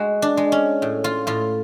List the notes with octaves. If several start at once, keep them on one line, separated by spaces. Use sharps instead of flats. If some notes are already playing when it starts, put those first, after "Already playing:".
Already playing: G#3 F#4
D4
G#3
C#4
A2
F4
A2 F4